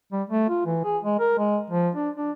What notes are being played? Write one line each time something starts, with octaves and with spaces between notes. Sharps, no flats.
G3
A3
F4
E3
G#4
G#3
A#4
G#3
F3
D4
D4